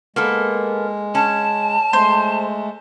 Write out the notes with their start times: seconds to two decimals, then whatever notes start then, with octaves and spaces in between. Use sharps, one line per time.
0.16 G#3 A#3 B3 A4
1.15 C#4 A5
1.93 G#3 A3 C5